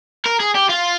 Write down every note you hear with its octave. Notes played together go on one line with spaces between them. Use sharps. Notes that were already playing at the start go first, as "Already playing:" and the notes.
A#4
G#4
G4
F4